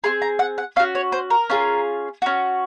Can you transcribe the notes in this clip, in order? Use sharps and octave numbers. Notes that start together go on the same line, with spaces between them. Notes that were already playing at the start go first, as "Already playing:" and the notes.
C4 F4 G#4 C6
A#5
F#5
F#5
C#4 F#4 F5
C#5
C5
A#4
C#4 F4 G#4
C#4 F#4